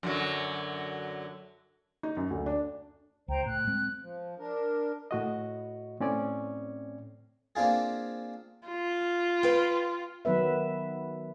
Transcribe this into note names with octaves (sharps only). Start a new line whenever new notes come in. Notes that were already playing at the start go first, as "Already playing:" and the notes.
F#2 D3 F#3
D#4
F#2
D2
D4
C#2 C5 G5 A#5
A2 F#6
G#3 C4
F3
D4 A#4
A2 F#4 D#5
A2 C4 C#4 D5
A#3 C4 D4 F4 G#4
F4
B4 G5
D#3 F#3 B3 B4 E5